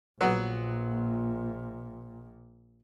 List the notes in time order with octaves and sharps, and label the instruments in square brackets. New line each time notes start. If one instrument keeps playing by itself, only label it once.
[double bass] A#1 A#2 [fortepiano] F#3 B3